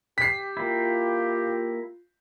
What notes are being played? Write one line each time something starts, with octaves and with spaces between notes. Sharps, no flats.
G4 B6 C7
A#3 E4 F4